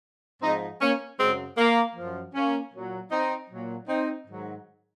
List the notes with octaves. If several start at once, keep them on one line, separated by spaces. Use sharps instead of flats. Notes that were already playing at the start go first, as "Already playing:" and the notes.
G#2 F3 C4 D#4
A#3 C#4
F#2 C#3 F#3 G#3 C4
A#3
F#2 F3
A#3 C#4
A#2 F#3
C4 D#4
A#2 F#3
C4 D#4
G#2 D#3 F#3